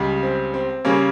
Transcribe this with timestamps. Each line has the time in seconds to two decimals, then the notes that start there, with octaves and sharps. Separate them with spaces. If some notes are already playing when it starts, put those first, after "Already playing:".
Already playing: C#2 C#3 G3
0.23 C4
0.54 C4
0.85 C#3 G3 A#3 C#4